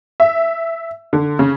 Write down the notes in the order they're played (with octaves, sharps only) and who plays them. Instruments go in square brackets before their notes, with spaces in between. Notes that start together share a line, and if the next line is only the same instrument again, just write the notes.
[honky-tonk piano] E5
D3
C#3